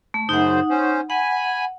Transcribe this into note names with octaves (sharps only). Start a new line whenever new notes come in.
A3
F#2 C#3 D#4 C5 F#5
C#4 C5
F#5 G#5 B5